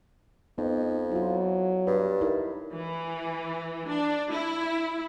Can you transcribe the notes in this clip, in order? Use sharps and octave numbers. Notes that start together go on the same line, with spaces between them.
F2 B3 D#4
F#3 E4 F4
G2 B4
D#4 E4 A#4
E3
D4
E4